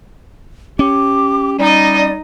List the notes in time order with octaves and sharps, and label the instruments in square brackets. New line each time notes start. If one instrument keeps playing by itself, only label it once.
[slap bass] C#4 [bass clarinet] G4 [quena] D6
[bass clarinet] G3 [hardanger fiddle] D#4 D#5 [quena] D5